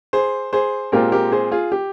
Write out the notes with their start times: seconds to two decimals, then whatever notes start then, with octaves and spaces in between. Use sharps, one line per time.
0.13 G#4 C5
0.53 G#4 C5
0.92 A#2 G#3 C4 F4 G4 A#4
1.12 G4 A#4
1.32 G#4 C5
1.51 F4 G#4
1.72 G4